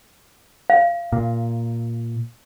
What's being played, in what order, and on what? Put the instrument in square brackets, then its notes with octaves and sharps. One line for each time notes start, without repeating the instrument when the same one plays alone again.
[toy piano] F5
[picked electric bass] A#2